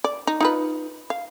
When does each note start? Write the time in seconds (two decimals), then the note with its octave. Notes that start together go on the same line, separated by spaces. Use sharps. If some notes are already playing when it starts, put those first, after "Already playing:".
0.04 D5
0.27 D#4
0.40 D#4 F4 B4
1.10 F5